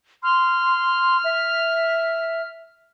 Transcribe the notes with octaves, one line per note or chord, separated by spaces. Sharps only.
C6 F6
E5